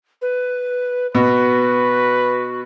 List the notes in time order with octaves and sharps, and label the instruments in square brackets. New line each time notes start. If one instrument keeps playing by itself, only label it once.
[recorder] B4
[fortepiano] B2 [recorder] F#4 [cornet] B4